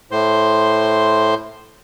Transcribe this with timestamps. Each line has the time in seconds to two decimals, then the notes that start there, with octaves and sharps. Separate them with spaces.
0.11 A2 C5 C6